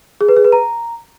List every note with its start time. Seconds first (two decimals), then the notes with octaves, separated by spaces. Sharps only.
0.21 G#4
0.29 B4
0.37 G#4
0.44 B4
0.52 A#5